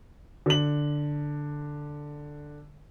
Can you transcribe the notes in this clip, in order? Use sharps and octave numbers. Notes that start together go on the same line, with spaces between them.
D3 F#7